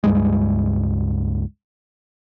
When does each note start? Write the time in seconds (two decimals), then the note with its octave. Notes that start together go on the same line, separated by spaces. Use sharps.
0.04 C#2 G2 G3 G#3